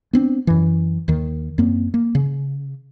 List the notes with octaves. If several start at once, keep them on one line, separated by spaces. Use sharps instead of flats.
B3 C4 D4
F#2 E3
D#2 D#3
F#2 A#3 C4
A#3
C#3